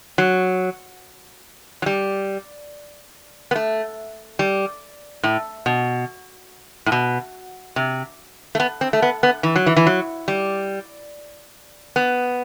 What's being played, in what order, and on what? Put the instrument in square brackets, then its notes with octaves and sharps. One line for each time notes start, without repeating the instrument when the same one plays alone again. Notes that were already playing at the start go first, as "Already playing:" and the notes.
[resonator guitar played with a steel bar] F#3
F#3
G3
B3
A3
G3
A2
B2
A2
B2
C3
A3
B3
C4
A3
B3
B3
E3
F#3
E3
E3
F#3
G3
B3